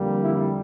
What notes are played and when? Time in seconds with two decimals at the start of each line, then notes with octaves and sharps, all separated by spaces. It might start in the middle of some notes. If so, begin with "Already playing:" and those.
Already playing: F2 D3 G3 A#3
0.22 E4